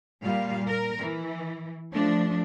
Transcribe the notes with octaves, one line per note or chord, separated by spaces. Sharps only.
A#2 G3 F5
A#4
E3
F3 A3 D4